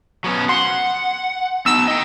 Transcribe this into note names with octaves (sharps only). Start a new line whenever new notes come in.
F#3 B3 C#4
F#5 C6
B3 D#4 E6
D#5 G5